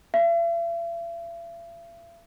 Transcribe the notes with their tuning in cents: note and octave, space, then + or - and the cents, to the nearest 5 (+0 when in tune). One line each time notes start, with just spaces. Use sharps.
E5 +45